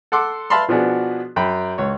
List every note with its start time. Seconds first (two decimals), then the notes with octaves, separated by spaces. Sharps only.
0.12 A4 F#5 C6 D6 E6
0.50 B4 E5 F5 A5 B5 C6
0.69 B2 F3 B3 D4 F#4 G#4
1.36 F#2 G5 B5
1.78 C#2 C#5